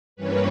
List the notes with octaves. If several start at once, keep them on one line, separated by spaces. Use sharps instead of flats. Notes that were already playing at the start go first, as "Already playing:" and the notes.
G2 E3 G3 A#3 C#4 B4 C#5